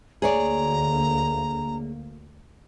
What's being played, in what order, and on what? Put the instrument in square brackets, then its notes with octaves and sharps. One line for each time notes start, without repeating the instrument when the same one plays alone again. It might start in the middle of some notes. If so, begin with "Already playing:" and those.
[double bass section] D2 A#3 [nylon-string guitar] G#4 C#5 D5 [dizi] A#5